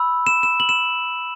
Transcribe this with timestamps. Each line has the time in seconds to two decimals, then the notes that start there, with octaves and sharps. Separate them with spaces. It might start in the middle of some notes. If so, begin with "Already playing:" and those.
Already playing: B5 E6
0.27 E7
0.43 E7
0.60 F#7
0.69 E7